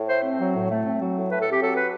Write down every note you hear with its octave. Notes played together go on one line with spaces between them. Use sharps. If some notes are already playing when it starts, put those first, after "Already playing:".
Already playing: A2
A3 C5
C4
F#3
A2
A3
C4
F#3
A2
A3 B4
C4 A4
G4
F#3 A4
B4